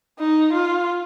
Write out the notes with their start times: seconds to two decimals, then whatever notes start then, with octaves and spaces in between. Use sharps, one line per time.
0.19 D#4
0.53 F4